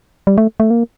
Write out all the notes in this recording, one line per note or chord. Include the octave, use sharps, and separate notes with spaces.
G3
A3
A3
A#3